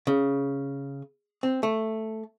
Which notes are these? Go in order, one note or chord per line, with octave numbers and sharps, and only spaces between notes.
C#3
C4
A3